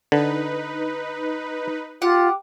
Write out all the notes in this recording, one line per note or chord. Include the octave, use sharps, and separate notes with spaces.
D3 D#4 B4
F4 G4 F#5